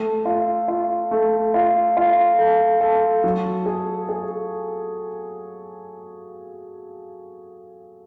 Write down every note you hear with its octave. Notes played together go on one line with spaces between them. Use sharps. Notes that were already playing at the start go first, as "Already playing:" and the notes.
Already playing: A3
F4
F4
A3
F4
F4
A4
A4
F#3
G#4
G#4